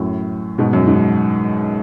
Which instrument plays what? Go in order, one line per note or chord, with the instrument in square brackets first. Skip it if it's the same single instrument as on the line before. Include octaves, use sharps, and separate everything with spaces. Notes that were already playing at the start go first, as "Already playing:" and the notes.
Already playing: [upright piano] F#2 A2
G#2 B2
F#2
G#2